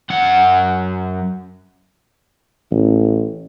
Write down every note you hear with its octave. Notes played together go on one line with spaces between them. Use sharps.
F#2 F#5
A1